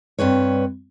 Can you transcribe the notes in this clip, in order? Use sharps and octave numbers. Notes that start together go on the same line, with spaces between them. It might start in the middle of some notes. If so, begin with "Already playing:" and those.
G2 C4 B4 C#5